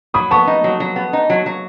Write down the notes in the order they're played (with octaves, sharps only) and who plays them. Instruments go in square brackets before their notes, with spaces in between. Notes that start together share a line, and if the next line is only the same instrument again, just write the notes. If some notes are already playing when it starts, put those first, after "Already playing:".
[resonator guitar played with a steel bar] F#3 [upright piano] B5 D#6
[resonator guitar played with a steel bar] B3 [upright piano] A5 C#6
[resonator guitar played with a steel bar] D#4
F#3
F#3
B3
D#4
F#3
F#3